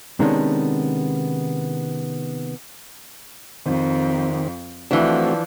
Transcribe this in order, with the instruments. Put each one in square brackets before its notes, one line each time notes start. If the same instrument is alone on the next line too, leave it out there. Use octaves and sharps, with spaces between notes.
[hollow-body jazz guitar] C3 D#3 G#3 B3 C#4 D4
[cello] F2 [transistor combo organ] D#3 C4
[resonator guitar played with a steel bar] E3 D4 [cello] F3 [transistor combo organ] A3 C4 F#4